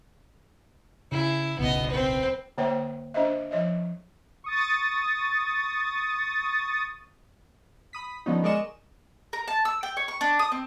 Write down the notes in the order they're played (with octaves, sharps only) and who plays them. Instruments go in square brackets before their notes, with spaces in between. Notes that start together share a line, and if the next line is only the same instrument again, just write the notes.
[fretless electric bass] C#3 [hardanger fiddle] E4
[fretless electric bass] D1 B1 C#3 [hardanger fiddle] B3 D#5
[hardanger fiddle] C4 B4
[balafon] D3 A#3 C5 C#5 E5 G5
D4 C5 D#5 E5
F3 C#5 D#5 E5
[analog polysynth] C#6 D#6 A6
[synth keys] B5 D#6 B6
D3 F3 B3 C#4 D#4
G#3 A#4 D5 D#5 C#6 E7
[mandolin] A#4
A5
E6
G5
C#5
C#6
D4
D#6
C4